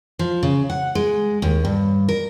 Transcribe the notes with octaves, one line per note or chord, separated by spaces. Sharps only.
F3
C#3
F#5
G#3
D#2
G2
A#4